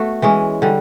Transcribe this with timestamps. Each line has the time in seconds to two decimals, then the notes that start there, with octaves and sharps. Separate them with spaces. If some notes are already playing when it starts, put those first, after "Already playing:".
Already playing: A3 B3 F#4
0.22 E3 G#3 C#4
0.62 D3 G3